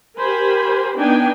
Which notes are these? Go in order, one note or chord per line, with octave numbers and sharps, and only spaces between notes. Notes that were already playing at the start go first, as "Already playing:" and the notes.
G4 A#4 C5 G#5 B5
B3 D4 D#4 G5 G#5